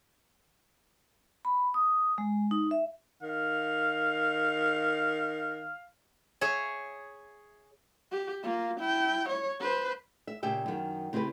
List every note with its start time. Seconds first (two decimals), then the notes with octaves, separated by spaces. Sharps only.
1.45 B5
1.74 D#6
2.18 G#3
2.51 D#4
2.71 E5
3.23 D#3 F5
6.41 G#4 C#5 E5
8.12 G4
8.43 A#3 F4
8.80 E4 G5
9.29 C#5
9.60 B4 C5
10.27 E5
10.43 A#2 C#3 G4 E5 G5
10.66 F#2 D#3
11.13 C#3 C4 E4 G4 B4